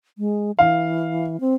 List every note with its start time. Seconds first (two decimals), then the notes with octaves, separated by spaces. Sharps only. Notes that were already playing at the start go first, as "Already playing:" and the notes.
0.18 G#3
0.59 E3 F5
1.40 C4